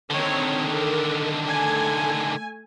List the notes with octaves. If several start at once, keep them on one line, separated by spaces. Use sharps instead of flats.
D3 D#3 C4 C#5
A4 A#4
A3 G#5